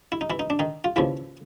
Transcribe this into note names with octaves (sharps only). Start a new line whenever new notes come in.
E4
D#4
E3 E4
D#4
D4
D#3 D#4
F4
D#2 C#3 E3 F3 E4